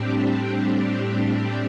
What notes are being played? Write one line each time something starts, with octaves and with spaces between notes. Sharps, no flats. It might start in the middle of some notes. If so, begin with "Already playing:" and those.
Already playing: A2 G3 C4 D4 G4
C4